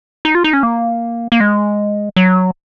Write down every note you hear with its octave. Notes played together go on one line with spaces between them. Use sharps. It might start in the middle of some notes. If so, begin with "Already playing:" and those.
D#4
F4
D#4
C#4
A#3
A#3
G#3
F#3